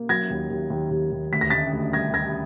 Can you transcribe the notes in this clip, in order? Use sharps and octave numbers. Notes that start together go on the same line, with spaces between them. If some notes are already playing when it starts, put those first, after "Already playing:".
Already playing: A#3
F#3 G#6 A#6
D#2
D#2
D#2
D#2
D#2
D2 B6
A#6
D2 A6 B6
D2
G3 G#6 A#6
D2 G#6 A#6